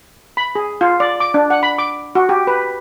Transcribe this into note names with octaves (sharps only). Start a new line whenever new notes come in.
B5
G#4
F4
D5
D6
D4
F#5
B5
D6
F#4
G4
B4